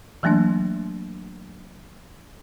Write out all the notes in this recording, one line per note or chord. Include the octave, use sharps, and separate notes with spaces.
E3 F#3 A3 A#3 D4